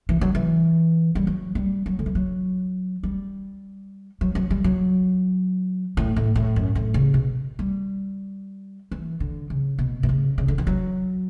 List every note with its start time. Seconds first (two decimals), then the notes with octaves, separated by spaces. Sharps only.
0.09 E3
0.21 F#3
0.35 E3
1.15 G3
1.27 F#3
1.55 G3
1.86 F#3
1.99 D3
2.06 E3
2.15 F#3
3.03 G3
4.21 F#3
4.35 F#3
4.50 G3
4.64 F#3
5.97 A2
6.16 A2
6.35 A2
6.56 F#2
6.75 A2
6.94 C#3
7.14 B2
7.59 G3
8.92 E3
9.20 D3
9.50 C#3
9.79 B2
10.03 B2
10.09 C#3
10.38 C#3
10.48 D3
10.58 E3
10.67 F#3